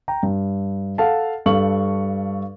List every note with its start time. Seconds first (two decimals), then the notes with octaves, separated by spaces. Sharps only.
0.08 G5 A#5
0.23 G2
0.98 A4 F5 F#5 A5
1.46 G2 A4 F5 C#6 F#7